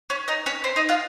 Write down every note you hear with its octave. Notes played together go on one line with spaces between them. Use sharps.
C#4 C#5
D#4 D#5
C#4 C#5
C4 C5
D#4 D#5
F4 F5